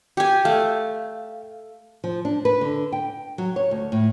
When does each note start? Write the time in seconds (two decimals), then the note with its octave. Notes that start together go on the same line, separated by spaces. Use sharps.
0.17 G4 G#5
0.45 A3 F5
2.04 F3
2.25 D4
2.45 B4
2.61 D3
2.92 G5
3.38 F#3
3.56 C#5
3.71 D2
3.92 A2